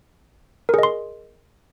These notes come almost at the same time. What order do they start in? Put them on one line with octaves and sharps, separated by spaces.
A#4 G#4 D#5 C6